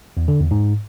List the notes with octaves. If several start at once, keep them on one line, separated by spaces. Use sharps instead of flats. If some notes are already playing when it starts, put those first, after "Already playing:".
E2
D3
E2
G#2